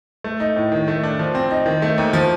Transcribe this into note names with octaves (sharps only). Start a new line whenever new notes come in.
A3
D#4
A2
D#3
A3
D4
F3
C4
D#4
D#3
A3
D#2
F3